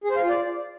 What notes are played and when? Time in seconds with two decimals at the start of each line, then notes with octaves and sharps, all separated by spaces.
0.04 G#4
0.10 C5
0.17 F5
0.23 F4
0.29 D5